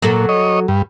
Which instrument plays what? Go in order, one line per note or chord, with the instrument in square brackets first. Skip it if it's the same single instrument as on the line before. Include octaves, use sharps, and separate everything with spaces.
[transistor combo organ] A#2 [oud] F#3 F#4 A4
[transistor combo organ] C#5 D#5
G2